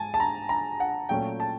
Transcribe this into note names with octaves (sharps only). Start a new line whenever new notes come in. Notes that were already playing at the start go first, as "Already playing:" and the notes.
Already playing: G#2 G#5 A5
A5
A#5
A#5
F#5
A#2 F#3 A3 C#4 G5
A5